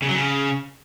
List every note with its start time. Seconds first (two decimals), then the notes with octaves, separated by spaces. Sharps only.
0.02 C#3
0.09 F#3
0.15 C#3